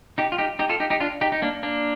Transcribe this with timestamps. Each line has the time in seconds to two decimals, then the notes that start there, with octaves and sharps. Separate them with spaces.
0.18 D#4 G4
0.32 F4
0.38 D#4 G4
0.59 D#4 G4
0.69 F4 A4
0.80 D#4 G4
0.90 D#4 G4
1.00 D4 F4
1.21 D#4 G4
1.32 D#4
1.42 A#3 D4
1.63 A#3 D4